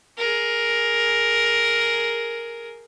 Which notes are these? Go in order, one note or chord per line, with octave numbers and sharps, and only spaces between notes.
G#4 A#4